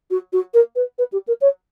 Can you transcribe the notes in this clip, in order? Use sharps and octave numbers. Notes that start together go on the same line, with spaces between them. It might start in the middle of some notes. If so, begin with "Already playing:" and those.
F#4
F#4
A#4
B4
B4
G4
A#4
C#5